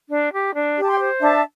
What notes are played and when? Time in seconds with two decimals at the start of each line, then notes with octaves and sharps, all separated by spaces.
0.10 D4
0.32 G4
0.54 D4
0.77 G4 A5
0.88 G5 C6
0.99 C5
1.21 D4 E5 A5